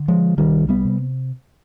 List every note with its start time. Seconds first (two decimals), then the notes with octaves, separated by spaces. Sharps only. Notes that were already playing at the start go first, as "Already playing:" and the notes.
Already playing: D3
0.08 F3 G#3
0.38 C2 D#3 G3
0.69 G3 B3
0.85 C3